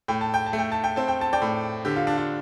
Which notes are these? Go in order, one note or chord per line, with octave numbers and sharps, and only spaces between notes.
A2 G5
A5
G5
A5
A3
G5
A5
G5
C4 A5
G5
A5
D5 G5
A2
D3 G4
F4
D4
F4